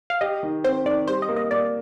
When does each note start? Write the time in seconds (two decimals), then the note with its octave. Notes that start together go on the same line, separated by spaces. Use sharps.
0.10 F5
0.21 G4 D#5
0.43 D#3
0.64 C4 C5
0.85 D#3 D5
1.07 G3 C5
1.22 D#5
1.29 A#3
1.36 D#5
1.51 A#3 D5